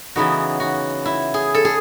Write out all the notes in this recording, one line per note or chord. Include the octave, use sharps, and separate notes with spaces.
C#3 E3 B3 D#4 F#4
F#4
E4
G#4
A4
G#4